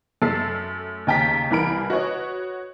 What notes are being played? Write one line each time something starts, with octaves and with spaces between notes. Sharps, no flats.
F#2 A3 A5 E6 A6 C7
D#2 C#3 G5 A5 A#5 B6
C2 E3 A#4 B5 D7
F#4 B4 C#5 D#5